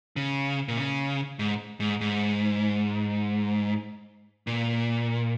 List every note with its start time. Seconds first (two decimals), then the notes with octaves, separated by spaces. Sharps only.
0.16 C#3
0.68 A#2
0.77 C#3
1.39 G#2
1.80 G#2
2.01 G#2
4.47 A#2